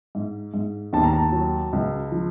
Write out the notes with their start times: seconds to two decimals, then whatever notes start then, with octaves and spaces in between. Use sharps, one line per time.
0.15 G#2
0.54 G#2
0.93 D#2 A5
1.04 A#5
1.13 A5
1.32 F#3
1.73 C#2
2.12 F3